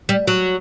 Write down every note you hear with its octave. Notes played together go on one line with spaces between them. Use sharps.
G3
F#3